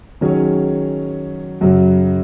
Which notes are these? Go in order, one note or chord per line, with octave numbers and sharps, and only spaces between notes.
D#3 F#3 C#4 G#4 C#5
F#2 C#3 F#3